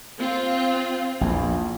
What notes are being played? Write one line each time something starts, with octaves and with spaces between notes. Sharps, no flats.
C4 F4
A#1 E2